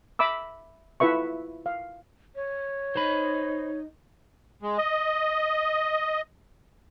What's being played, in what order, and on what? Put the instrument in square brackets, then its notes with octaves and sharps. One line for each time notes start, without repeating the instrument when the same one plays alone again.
[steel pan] E5 B5 D6 E6
E4 F4 B4 E5 C#6
F5
[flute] C#5
[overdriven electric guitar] D#4 [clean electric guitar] C5 B5
[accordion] G#3
D#5